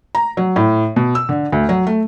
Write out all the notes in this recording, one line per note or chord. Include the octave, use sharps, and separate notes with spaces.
A#5
F#3
A2
B2
E6
D3
D2
F#3
A3